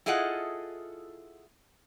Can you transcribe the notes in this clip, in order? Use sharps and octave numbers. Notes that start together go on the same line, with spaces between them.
E4 F4 G#4 A4 D#5 F#5